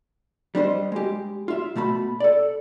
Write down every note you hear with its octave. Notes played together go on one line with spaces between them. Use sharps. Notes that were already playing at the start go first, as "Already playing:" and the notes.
G3 D4 C5 D#5
G#3 G4
F4 E5
B2 A3 A5 B5
A4 D5